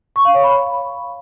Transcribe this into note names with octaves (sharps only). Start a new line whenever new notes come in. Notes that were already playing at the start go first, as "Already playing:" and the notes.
C#6
F5
C#5
B5